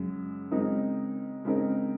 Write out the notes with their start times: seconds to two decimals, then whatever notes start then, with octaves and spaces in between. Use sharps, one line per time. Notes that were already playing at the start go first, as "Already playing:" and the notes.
Already playing: F#2 C#3 G#3
0.51 C#3 G#3 C4 D#4 A#4
1.45 C#3 G#3 C4 D#4 A#4